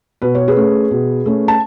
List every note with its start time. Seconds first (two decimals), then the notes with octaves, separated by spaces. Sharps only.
0.22 B2 B4
0.35 C#5
0.48 G#4 B4
0.56 A3 C#4
0.91 B2
1.26 A3 C#4
1.48 A5